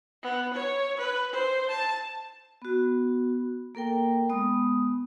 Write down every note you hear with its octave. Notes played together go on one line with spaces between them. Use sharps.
B3
C#5
B4
C5
A5
B3 F#4
A#3 A4 A#4 G5
G#3 B3 D#6